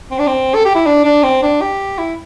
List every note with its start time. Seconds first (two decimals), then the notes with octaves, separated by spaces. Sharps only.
0.11 C4
0.19 D4
0.27 C4
0.55 A4
0.65 G4
0.75 E4
0.86 D4
1.05 D4
1.23 C4
1.43 D4
1.61 G4
1.99 E4